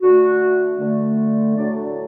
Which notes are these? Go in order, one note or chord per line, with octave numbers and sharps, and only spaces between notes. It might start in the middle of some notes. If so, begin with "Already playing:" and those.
D3 A3 F#4
D3 A3
A2 F#3 A3 D4 D5